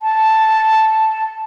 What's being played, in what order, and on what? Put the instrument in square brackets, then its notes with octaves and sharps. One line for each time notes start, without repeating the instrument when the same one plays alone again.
[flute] A5